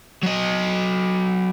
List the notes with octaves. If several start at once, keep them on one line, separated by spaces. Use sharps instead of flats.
F#3 D#5